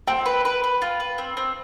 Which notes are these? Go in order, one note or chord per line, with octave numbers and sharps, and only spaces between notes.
C4 G5
B4
B4
B4
F4
B4
C4
C4